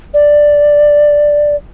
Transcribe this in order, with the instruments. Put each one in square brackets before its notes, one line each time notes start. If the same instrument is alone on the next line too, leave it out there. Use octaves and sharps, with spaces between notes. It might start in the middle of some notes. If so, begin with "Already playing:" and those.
[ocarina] D5